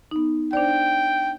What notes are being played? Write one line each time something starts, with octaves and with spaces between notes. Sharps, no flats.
B3 D#4
D4 C5 D5 G5